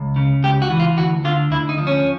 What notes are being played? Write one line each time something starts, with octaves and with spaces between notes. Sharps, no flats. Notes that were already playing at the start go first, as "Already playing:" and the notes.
Already playing: C#2
C#3
C#2 G4
F#4
E3
F4
D2 F#4
D3 F4
D2 E4
D#4
F3
C#4